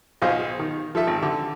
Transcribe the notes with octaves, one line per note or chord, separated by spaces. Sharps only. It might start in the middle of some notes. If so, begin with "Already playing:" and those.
B1 F4 G#4 C5 D#5 F5
D#3
F3 A4 E5 A5
G#1
D3